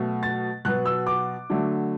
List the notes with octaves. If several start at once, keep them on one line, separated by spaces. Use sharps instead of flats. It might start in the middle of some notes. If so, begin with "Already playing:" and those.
Already playing: B2 F#3 A3
A6
B2 F#3 B3 F#6
E6
D6
D3 F#3 A3